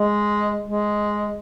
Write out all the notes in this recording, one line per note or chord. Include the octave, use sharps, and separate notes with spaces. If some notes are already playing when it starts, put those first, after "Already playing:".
Already playing: G#3
G#3